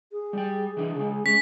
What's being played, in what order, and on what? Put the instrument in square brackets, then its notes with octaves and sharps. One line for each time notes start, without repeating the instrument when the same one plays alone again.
[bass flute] G#4
[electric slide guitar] G3 G5
E3 D4
C#3 G#3
[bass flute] G#3 [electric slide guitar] C#4 [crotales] B6